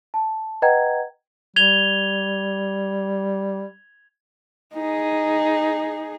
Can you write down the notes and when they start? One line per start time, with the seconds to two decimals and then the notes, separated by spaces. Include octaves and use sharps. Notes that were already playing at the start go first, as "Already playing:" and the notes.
0.14 A5
0.62 B4 D#5 F#5 G5 A#5 G#6
1.56 G3 G#6 F7 G7
4.74 D#4 G#4